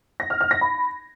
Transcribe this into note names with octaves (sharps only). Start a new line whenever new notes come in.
A#6
F6
F6
A#6
B5